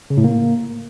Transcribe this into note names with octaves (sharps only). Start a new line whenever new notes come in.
C#3
A2
A#3